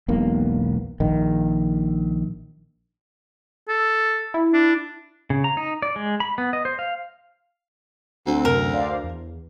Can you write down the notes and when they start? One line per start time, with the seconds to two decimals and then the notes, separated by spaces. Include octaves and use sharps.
0.08 E1 B1 A#3
1.00 A#1 D#3
3.68 A4
4.34 E4
4.53 D4
5.30 C#3
5.44 A#5
5.57 D#4
5.82 D5
5.96 G#3
6.20 B5
6.38 B3
6.53 D#5
6.65 C5
6.79 F5
8.26 D2 C4 D4
8.45 F#2 C3 A#4
8.73 C5 D5 F5
9.03 E2